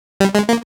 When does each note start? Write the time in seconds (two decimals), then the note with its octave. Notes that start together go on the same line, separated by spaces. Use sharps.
0.20 G3
0.35 G#3
0.49 A#3